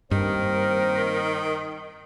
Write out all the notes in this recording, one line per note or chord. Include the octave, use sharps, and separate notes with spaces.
G2 D#3 A#3 C4 A#4 C5